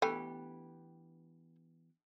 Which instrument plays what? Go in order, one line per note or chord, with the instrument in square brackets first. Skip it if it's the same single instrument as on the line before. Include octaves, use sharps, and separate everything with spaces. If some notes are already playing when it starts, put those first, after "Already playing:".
[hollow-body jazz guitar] E3 B3 G4 [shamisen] A3 G#5 [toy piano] D4 G5 B5